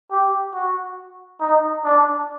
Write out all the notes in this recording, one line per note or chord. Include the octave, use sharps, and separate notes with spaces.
G4
F#4
D#4
D4